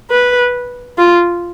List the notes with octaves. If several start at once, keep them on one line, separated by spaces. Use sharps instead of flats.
B4
F4